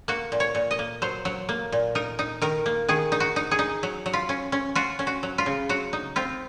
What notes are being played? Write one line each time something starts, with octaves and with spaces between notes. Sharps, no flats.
A#3 F#4
A#2
C#5
A#2
D#5
A#3
F#3 C5
F#3
A#3
A#2
D#4 A#4
D#4
D#3 A#4
A#3
D#3 G#4
D#4
F#4
D#4
G#4
D#4
F#3
F#3
F4
C#4
C#4
F4 F#4
C#4
F#4
F#3
F4
C#3
F#3 F#4
D#4
C4 F4